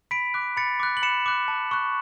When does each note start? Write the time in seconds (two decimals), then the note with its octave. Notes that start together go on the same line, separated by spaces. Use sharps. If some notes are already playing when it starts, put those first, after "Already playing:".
0.11 B5 B6 D7
0.34 D6 F#6
0.57 B5 A6 C#7
0.80 D6 F#6
0.97 F#7
1.02 B5 C#7 E7
1.26 D6 F#6
1.48 A5
1.71 C#6 F#6